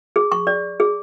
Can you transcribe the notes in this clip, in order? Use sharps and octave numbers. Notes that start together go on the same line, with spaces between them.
G#4
C#6
D5
G#4